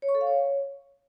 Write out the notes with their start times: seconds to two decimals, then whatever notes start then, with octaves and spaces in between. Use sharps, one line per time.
0.02 C#5
0.08 C#6
0.15 A4
0.21 F5
0.27 C#5